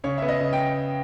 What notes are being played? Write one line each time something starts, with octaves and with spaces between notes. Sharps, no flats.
C#3 C#5
B3 E5
D#5
C#3
G5